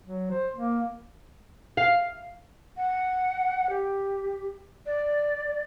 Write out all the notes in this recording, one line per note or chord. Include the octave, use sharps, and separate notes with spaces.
F#3
C5
A#3
F5
F#5
G4
D5